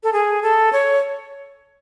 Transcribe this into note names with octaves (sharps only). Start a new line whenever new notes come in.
A4
G#4
A4
C#5